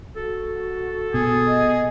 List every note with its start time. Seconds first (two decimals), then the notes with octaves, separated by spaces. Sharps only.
0.16 F#4 A4
1.14 B2 G#4
1.47 D#5